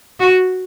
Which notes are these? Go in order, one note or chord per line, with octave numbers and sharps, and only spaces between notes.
F#4